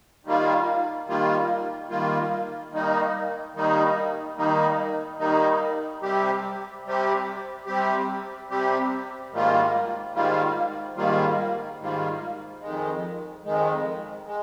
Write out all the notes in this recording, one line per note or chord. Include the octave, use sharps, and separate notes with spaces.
D#3 G3 A#3 F4
D#3 G3 A#3 F4
D#3 G3 A#3 F4
D#3 G3 A#3 D#4
D#3 G3 A#3 D#4
D#3 G3 A#3 D#4
D#3 G3 A#3 D#4
C3 G3 C4 G4
C3 G3 C4 G4
C3 G3 C4 G4
C3 G3 C4 G4
G#2 D#3 G3 A#3 F4
G#2 D#3 G3 A#3 F4
G#2 D#3 G3 A#3 F4
G#2 D#3 G3 A#3 F4
F2 D#3 G#3
F2 D#3 G#3
G#3